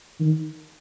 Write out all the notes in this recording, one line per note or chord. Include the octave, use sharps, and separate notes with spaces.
D#3